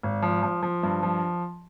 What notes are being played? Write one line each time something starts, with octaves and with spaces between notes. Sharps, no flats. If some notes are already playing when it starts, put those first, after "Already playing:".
G#1
F3
F3
F3
G2
F3